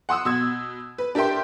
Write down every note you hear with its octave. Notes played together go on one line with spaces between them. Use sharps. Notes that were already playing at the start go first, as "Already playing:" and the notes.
F#5 C6 D#6 E6
B2 E6 G#6
B4
D4 G4 A#4 E5 G5 C6